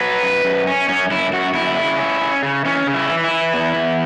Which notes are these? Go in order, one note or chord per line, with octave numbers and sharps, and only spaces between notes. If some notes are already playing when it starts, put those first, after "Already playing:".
F#3 B4
F#2
F#2
C#4
F#2 C#4
F#2 E4
F#2 F#4
F#2 E4
C#3
C#4
C#4
C#3
E3 C#4
C#3
E4
E3
E4
E3
E2
E2